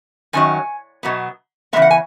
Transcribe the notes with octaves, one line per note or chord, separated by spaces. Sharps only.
F#2 D#3 F#3 G#5
B2 F#3 B3
C#3 E3 G#3 B3 E5
F#5
G#5